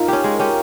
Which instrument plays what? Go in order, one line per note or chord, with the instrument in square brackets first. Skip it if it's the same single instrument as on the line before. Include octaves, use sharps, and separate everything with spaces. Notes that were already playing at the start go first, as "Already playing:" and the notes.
Already playing: [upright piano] D#4 F4 A#4
[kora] C#4 G4
G#3
C#4 G4